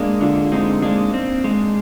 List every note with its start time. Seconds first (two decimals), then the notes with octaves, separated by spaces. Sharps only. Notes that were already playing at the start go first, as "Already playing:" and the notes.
Already playing: G#3 A#3 D4
0.21 D3 D4 F4
0.52 G#3 C4 D#4
0.82 G#3 A#3 D4
1.14 C4
1.44 G#3